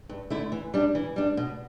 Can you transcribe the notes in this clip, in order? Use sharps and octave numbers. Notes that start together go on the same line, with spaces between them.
G2
D3 A3 E4
E3
G3 D4
E3
G3 D4
B2